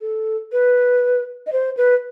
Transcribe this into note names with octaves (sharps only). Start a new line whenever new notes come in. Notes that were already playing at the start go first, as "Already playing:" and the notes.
A4
B4
D#5
C5
B4